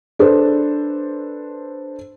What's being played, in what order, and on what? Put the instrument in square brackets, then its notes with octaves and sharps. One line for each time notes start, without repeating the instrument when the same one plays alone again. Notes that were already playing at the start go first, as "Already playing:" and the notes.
[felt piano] D4 A4 B4 C5